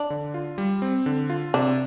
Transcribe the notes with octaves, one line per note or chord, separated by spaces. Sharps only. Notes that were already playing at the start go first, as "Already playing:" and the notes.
Already playing: D4
D3
F4
G3
C4
D3
F4
C3 D4